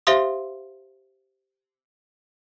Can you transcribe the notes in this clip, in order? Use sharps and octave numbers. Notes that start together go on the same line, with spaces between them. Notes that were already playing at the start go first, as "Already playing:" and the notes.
G4 C5 E5 F5 C6 D#6